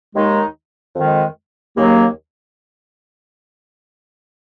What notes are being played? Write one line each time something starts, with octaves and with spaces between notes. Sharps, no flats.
D#2 D#3 G#3 D#4
F2 D#3 G#3
D#2 C#3 F#3 A#3